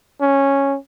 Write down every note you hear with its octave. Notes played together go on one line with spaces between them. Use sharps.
C#4